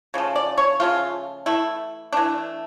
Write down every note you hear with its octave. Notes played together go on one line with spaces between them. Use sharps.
C#3 F3 A3
D5
C#5
C#3 F3 A3 F4
E3 A3 E4
E3 A3 D4